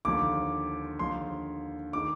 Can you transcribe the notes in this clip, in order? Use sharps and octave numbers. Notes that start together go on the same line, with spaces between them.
D#2 D3 F3 D6
D#2 D3 F3 C6
D#3 D6